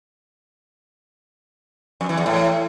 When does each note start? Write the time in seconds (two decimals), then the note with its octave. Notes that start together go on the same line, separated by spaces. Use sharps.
2.01 F2
2.09 E3
2.18 E2
2.26 A2